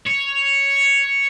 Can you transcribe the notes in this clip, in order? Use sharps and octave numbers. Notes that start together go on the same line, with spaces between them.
C#5